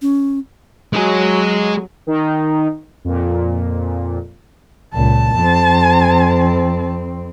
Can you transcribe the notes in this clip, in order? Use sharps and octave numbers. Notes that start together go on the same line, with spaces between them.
C#4
F#3 G#3 G#4
D#3 D#4
F2 A#2
C#2 A#2 A5
F2 C4